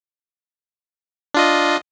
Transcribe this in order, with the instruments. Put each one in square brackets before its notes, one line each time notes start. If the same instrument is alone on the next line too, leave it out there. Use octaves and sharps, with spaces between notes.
[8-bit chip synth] D4 F4 D#5